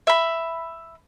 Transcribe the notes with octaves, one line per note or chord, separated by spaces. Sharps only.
E5 B5